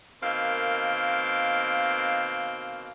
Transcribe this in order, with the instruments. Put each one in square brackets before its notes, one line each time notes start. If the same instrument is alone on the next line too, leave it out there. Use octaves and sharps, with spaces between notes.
[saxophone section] B2 D#3 A#3 C4 F5